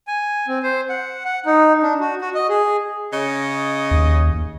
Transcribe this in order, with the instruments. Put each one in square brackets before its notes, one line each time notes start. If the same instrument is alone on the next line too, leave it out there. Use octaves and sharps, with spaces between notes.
[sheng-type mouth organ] G#5
C4
C5
F#5
F#5
D#4
D4
F#4
F#4
D#5
G#4
[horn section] C#3 C#5 D#5
[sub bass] D#2